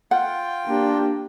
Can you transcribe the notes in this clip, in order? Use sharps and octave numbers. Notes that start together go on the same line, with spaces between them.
F4 F#5 G5
A#3 D4 G4